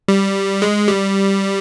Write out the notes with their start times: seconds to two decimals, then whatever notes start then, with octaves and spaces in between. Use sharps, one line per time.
0.08 G3
0.62 G#3
0.88 G3